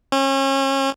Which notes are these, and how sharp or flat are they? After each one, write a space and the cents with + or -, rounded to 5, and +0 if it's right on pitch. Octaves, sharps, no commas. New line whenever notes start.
C#4 -35